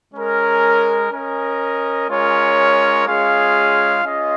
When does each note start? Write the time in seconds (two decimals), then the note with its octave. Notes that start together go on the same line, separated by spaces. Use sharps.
0.14 G#3 C#4 A#4
1.11 C#4 A#4 D#5
2.08 G#3 C#4 F4 A#4 C#5
3.06 G#3 C#4 F4 G#4 F5
4.04 C#4 F4 G#4 D#5